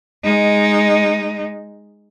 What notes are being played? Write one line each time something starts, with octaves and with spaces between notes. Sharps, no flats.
G#3 D#4